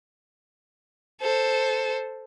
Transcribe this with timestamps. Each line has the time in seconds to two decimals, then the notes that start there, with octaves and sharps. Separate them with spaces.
1.21 A4 C5